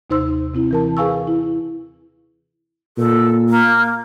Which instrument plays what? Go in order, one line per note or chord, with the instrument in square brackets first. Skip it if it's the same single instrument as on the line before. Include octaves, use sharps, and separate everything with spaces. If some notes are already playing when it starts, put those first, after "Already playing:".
[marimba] D#2 C3 D#4 C5 C6 E6
C3 C4 E4
E3 A#4 A5
G#4 B4 F5 G#5 C#6 E6
E4
[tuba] A#2 [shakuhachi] A4
[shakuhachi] A#3